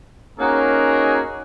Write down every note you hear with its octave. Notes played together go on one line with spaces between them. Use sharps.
A#3 C#4 D#4 F#4 G#4 A#4